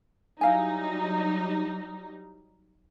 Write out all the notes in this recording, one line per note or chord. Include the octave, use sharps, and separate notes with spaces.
F#3 G3 D#4 E4 F5 G#5